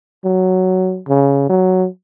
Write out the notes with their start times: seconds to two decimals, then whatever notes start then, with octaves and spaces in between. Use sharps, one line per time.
0.25 F#3
1.08 C#3
1.50 F#3